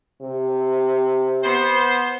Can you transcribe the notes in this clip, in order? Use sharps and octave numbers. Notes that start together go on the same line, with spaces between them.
C3
B3 C5